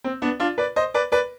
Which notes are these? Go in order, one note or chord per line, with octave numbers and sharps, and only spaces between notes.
C4
B3 D4
D4 F4
B4 D5
C5 D#5
B4 D5
B4 D5